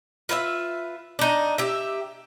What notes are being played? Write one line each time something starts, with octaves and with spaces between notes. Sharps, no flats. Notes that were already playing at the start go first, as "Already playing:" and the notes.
F4 B4 C#5 E5
D4 D#4
G4 E5